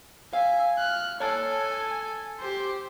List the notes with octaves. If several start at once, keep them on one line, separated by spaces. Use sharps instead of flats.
E5 F5 G#5
F6 F#6
A4 C#5 G#5 A5
G4 C5